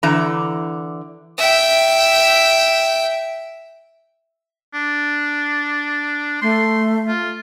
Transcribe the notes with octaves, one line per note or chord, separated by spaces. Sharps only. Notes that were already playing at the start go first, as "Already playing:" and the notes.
D3 E3 A#5
E5 G5
D4
A3 C6
F4